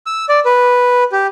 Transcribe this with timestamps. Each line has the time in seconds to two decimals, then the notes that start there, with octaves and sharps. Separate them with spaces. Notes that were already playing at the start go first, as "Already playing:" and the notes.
0.06 E6
0.29 D5
0.45 B4
1.12 G4